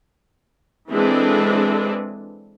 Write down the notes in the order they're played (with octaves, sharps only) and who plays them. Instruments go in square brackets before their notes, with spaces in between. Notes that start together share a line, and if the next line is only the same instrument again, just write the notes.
[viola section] E3 G#3 C4 D4 A4 B4